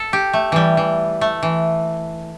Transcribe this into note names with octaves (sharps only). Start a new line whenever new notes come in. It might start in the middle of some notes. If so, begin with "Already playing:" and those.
Already playing: A4
G4
A3
E3 G3
E3
A3
E3